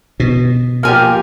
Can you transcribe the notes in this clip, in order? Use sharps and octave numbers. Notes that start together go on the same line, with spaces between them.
B2
F3 A#3 G4 G#5 F6